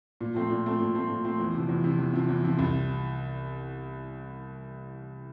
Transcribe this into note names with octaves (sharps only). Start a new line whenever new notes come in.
A#2
F3 A3 C4
A#2
F3 A3 C4
A#2
F3 A3 C4
A#2
F3 A3 C4
E2
C3 F3
E2
C3 F3
E2
C3 F3
E2
C3 F3
C2